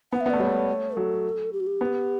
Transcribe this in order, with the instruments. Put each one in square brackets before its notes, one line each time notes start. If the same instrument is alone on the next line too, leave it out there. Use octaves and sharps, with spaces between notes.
[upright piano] B3 [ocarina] F#5
[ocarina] E5
[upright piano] B3
[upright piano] A3 [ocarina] D5
[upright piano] G3 [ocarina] C#5
[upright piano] A3
[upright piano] F#3 [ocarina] A4
[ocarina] G4
F#4
G4
[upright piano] B3